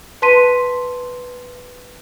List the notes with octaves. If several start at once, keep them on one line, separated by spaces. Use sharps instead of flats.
B4 A5 C6 B6 D#7